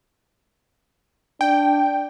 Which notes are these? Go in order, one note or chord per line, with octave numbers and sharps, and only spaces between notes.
D4 G5